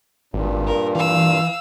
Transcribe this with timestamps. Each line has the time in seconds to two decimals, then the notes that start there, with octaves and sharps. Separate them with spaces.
0.34 G#1 G2 A#2
0.67 A#4
0.95 E3 F5 E6